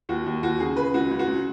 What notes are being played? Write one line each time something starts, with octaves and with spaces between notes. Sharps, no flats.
D#2 F#4
D#2
D#2 F#4
C#3 G#4
C#3 B4
C#2 F#4
C#2
F#4
C#2